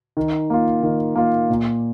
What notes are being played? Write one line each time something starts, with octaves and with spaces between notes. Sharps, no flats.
D#3
A#3 F4
D#3
A#3 F4
A#2